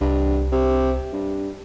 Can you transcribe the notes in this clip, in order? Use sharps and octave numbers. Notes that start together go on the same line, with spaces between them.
C2 G2
C3
G2